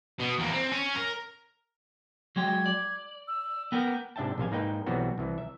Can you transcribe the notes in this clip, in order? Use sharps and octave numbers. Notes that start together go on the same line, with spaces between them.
B2
E2 A#3
C4
C#4
A#4
F#3 G#3 G5 G#6
D5
E6
B3 A#4 G5
G#2 C3 D4 E5 G5 A5
A#1 C3 C5 F5 G#5
G#2 A#3 D#4 B4 G5
B1 E3 G3 B3 C4 F#4
C2 E3
E5